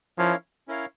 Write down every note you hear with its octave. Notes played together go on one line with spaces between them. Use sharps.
F3 C#4 E4 A#4 C#5 F5
C#4 E4 A#4 C#5 F5